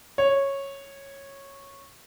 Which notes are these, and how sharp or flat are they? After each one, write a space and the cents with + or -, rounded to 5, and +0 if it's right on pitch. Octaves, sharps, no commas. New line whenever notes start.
C#5 -10